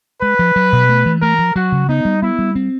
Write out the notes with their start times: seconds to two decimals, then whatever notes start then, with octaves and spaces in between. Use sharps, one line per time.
0.22 G#3 B4
0.39 F3
0.56 F#3
0.73 B2
0.89 A3
1.06 E3
1.22 A3 A#4
1.39 F3
1.55 F#3 F#4
1.72 C#3
1.88 B3 D#4
2.05 G3
2.22 B3 E4
2.39 G3
2.55 C4